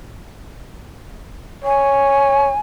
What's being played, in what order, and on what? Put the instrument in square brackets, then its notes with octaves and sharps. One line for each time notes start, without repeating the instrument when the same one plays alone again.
[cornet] C#5 [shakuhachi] G#5